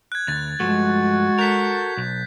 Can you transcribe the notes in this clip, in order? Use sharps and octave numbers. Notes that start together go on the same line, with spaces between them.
F#6 G#6
D2 A6
G2 F3 G#3 A3 F#4
A4 A#4 G6 B6
B1